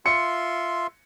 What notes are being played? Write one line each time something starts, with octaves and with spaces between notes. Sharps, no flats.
F4 E5 C6 C#7